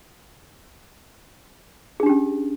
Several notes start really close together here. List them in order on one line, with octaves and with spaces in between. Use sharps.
G#4 D4 G4 C#4